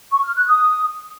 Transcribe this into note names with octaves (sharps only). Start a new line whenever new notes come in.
C#6
F6
F#6
D#6